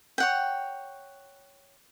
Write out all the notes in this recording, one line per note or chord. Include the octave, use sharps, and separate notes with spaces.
C#5 F#5 G5